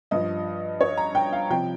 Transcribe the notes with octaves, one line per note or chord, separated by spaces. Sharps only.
G2 F3 D#5
C#5
A#5
G5
F5
C3 F3 G5